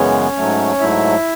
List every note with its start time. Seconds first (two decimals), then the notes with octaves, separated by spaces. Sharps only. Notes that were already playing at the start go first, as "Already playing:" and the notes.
Already playing: F#2 C#3 E3 G#3 B3 C#4 C#5
0.37 G#2 F#3 A3
0.80 G#2 F#3 A3 E4 E5